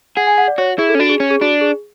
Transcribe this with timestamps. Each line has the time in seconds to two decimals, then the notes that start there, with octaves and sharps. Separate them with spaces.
0.16 G#4 F#5
0.27 G#5
0.38 F#5
0.48 D5
0.58 F#4 C#5
0.78 E4 G#4
0.89 A4
0.95 C#4
1.00 D4 F#4
1.09 G#4
1.20 C#4
1.31 G#4
1.41 D4 F#4
1.61 G#4